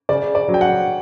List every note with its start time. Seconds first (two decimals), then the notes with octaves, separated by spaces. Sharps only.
0.09 C#3 D5
0.35 D5
0.48 F#3
0.54 G5
0.61 F#5